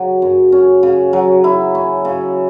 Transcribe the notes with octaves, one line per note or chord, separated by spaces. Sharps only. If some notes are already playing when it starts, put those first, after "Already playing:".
Already playing: C#3 F#3
F#2
C#4
C#3
F#3
E4
C#4
C#3